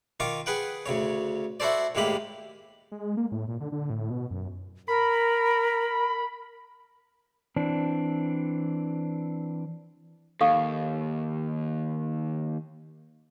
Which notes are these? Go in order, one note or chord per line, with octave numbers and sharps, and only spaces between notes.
D#3 F4 C#6 D6
G#4 B4 F#5 G5
D2 C#3 C#5
E4 F#4 A4 C5 D5
D#2 A2 G#3 A#3 G4 B5
G#3
A#3
A2
A#2
D3
D3
A2
B2
F#2
A#4 B5
E3 C4 D4
D#2 A4 F5 C#6